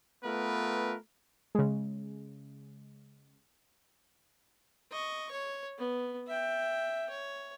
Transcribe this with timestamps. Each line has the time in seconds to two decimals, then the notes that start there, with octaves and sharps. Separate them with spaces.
0.24 A3 B3 F4 A#4 B4
1.55 C#3 G#3
4.91 D#5 C#6
5.31 C#5
5.78 B3
6.27 E5 G5
7.10 C#5